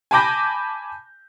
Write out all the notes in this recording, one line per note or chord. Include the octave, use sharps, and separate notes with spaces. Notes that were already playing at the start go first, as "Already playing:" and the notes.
G#5 A5 B5 D6 G6 A#6